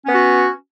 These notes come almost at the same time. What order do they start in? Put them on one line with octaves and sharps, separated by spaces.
C#4 B3 F#4